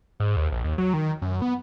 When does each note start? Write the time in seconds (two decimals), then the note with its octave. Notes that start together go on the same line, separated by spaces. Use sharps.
0.20 G#2
0.36 D#2
0.52 A#1
0.64 D#2
0.78 F#3
0.94 D#3
1.22 F#2
1.42 B3